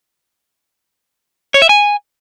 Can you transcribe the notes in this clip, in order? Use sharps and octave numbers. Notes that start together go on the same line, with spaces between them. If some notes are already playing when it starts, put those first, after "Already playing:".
C#5
E5
G#5